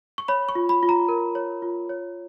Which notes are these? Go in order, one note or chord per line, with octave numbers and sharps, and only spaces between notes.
C#6
C#5 B5
C#6
F4
B5
F4
A#5
A#4
C#5
F4
C#5